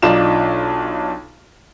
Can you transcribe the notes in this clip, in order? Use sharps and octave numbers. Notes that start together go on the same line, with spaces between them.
B1 D4 D#4 F4 E7